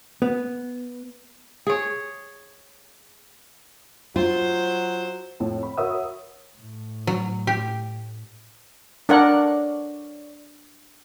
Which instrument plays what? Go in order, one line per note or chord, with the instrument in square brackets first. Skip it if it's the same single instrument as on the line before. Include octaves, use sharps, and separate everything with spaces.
[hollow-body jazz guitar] B3
[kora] G#4 C#5
[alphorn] F#3 [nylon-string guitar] F4 [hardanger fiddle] C5
[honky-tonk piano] F2 A2
B5
F#4 A#4 C#5 E5 D#6 E6
[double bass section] A2
[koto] F#3
G4
[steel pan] D4 A#4 F#5 [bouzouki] C#5 D5